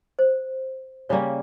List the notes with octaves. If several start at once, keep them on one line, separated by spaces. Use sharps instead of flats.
C5
C#3 G3 A#3 C#4 C#5